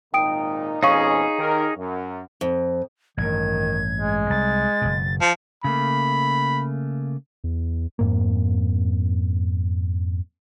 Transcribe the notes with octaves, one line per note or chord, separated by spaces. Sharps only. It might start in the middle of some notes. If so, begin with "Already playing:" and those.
G#1 A#2 D#4 G5 D#6 D7
F2 B2 C#4 D#4 G#4 C#5 F5 C#6
D#3 G4 A#4
F#2
F2
A1 G2 D#3 G#6
G#3
C2 A6
F#1 B2
F3 A5
C#3 A3 A#3 B5
E2
F2 G#2 A#3